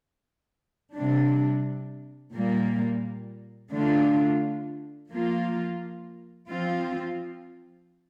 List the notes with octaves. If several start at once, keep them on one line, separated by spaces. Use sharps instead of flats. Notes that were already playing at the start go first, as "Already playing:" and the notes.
C3 G3 D4
A#2 G3 A#3
D3 A3 D4 F4
F3 A#3 F4
F3 C4 F4